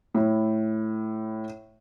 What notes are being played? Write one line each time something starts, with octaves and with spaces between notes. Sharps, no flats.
A2 E4